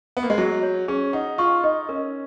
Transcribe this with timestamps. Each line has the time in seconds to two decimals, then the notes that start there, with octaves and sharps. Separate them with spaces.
0.17 B3
0.23 A#3
0.30 G#3
0.38 F#3 G#4
0.63 C#5
0.88 C#4 G#4
1.13 D#4 F#5
1.38 F4 C#6
1.63 D#4 D#5
1.89 C#4 A#4